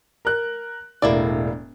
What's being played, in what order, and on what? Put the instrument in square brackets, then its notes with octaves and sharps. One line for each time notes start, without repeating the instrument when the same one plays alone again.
[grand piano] A#4 F#6
[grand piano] E1 A2 D4 [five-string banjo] A#3 E4 D5